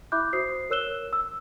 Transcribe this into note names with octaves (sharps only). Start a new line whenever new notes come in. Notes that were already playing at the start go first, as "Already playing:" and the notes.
E4 E5 B5 D6 F#6 G6
F#4 C5 D#6 C7
A#4 C#5 E6 F#6 E7 G7
E6